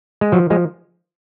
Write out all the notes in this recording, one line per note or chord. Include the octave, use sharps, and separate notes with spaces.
G#3
F3 F#3
F3 G#3